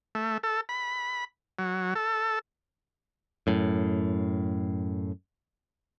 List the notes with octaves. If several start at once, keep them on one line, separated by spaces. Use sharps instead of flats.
A3
A4
B5
F#3
A4
F#2 A2